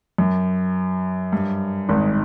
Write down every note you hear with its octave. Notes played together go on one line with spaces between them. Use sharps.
F#2
G2
G#1 G#2